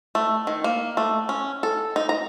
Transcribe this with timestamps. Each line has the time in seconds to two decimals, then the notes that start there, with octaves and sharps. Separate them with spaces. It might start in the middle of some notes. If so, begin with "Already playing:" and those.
0.15 A3
0.47 D#3
0.64 A#3
0.97 A3
1.29 C#4
1.63 A4
1.96 D#4
2.09 A#5